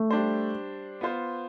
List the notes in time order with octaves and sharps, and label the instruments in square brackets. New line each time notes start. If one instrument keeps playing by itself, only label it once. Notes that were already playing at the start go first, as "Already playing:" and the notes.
Already playing: [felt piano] A3
[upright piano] G3 D4 G4 C5
B3 F4 C5